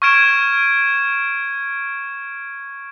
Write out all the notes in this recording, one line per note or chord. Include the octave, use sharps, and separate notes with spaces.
C#6 F6 G#6 D7 E7